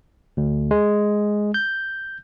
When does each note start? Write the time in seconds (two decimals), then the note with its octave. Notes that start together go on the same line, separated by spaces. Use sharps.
0.37 D2
0.71 G#3
1.54 G6